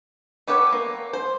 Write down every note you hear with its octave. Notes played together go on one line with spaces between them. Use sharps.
B3 G4 A4 B4 C#5
A#3
C5